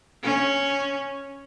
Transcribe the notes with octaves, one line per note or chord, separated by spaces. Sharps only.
C#4